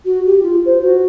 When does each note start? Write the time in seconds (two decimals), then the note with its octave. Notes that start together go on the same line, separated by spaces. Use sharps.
0.05 F#4
0.26 G4
0.43 F4
0.66 C5
0.82 F#4